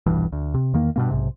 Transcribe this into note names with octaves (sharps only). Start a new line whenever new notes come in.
D#1 B1 G2 E3
D2
C3
E2 D#3 A#3
G2 B2 A#3
B1 G#2 C3